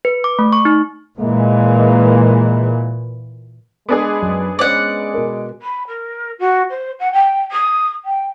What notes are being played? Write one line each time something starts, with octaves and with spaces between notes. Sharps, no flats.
B4
D6
A3
C#6
D#4
A#2 E3 G#3 A#3
G#3 B3 D4 G#4
F#2
G#3 C#4 C5 D5 F#5
B2 A#4
B5
A#4
F#4
C5
F#5
G5
D#6
G5